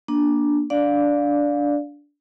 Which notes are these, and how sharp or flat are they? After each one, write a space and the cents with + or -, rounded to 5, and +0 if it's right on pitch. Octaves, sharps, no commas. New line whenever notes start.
A#3 +25 D4 +0
D4 -15 D5 +0 F5 +15